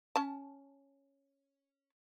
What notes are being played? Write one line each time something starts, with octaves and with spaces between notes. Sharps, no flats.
C#4 A5